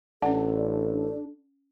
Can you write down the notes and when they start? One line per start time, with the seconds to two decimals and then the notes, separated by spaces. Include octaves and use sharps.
0.22 A1 C#4 D4 A4 F#5